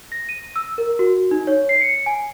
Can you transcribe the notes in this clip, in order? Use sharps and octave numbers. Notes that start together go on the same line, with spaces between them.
A#6
D#7
E6
A#4
F#4
D#4
C#5
C7
C#7
G#5